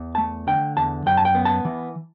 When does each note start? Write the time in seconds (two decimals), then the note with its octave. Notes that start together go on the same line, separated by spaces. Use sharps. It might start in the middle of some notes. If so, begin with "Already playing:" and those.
Already playing: E2
0.15 A3 A5
0.47 D3 G5
0.77 E2 A5
1.06 F#2 G5
1.17 A5
1.25 G5
1.35 B3
1.45 A5
1.65 E3